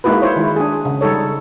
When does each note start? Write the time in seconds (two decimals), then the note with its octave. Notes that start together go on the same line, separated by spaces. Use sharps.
0.04 G#3 A#3 D#4 E4 F#4 B4
0.22 E4 C5 C#5
0.36 D#3 G#3 E4
0.56 D4 G#4
0.85 C#3
1.01 G3 D#4 A4 C#5